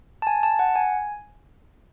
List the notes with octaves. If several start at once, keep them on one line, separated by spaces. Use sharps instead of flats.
A5
G#5
A5
F#5
G#5